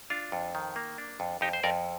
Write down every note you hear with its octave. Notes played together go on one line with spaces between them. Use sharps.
D4 F4
F2
D#3
A#3
D4
F2
F2 D#4 G4
C5
F2 A#4 D5